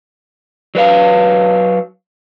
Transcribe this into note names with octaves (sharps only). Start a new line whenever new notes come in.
F#3 B4 F5